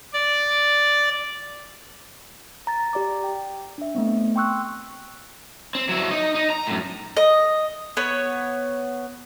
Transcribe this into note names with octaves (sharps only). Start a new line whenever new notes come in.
D5
A#5 A6
G4 D5 A#5 D6
G5
D4 E5
A3 B3 C4
G5 C6 C#6 E6 F#6
C4
F#3 E4
D#4
D#4
A#5
F#2 A2
D#5
B3 C#5